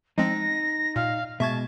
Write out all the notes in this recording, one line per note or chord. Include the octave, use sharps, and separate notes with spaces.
F3 G#3 C4 D#4 A#6
A#2 F5
B2 G#3 E5 A5 C#6 G#6